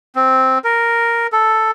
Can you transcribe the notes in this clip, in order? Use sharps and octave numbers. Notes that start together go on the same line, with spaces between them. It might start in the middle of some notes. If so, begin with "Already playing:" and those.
C4
A#4
A4